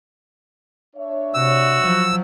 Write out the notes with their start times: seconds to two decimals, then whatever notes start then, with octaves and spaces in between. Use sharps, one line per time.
0.96 D4 C#5 E5
1.34 C3 F#4 E6
1.82 F3 F#3